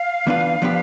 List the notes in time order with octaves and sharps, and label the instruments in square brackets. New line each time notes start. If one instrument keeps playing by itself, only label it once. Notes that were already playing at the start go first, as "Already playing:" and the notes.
Already playing: [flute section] F5
[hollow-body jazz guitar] E3 B3 D4 F4 B4
F3 B3 D4 G4 B4